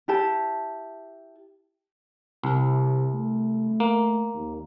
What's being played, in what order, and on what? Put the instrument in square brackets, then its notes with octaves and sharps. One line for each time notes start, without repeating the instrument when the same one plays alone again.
[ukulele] E4 G4 A5
[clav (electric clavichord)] C2 [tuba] C3
[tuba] A3
[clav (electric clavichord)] A#3
[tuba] D#2